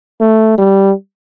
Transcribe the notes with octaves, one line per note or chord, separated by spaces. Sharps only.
A3
G3